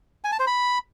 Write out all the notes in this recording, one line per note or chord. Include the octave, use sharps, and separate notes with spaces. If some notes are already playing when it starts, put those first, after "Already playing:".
G#5
A5
C5
B5